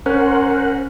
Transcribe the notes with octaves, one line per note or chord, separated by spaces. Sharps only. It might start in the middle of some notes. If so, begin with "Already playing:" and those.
C#4 A#4 C5 F#5